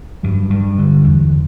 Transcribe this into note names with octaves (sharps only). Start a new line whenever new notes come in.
G2 F#3
G2
D3
E2